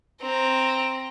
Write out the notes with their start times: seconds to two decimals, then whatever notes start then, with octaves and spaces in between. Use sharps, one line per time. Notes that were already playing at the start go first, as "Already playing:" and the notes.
0.22 C4 A#5